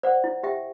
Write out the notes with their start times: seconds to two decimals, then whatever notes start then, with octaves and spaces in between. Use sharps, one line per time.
0.03 C5 D5 F#5
0.24 E4
0.43 G4 E5 G5